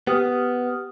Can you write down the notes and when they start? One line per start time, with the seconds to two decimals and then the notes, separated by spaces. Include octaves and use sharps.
0.07 B3 G4 D#6 F6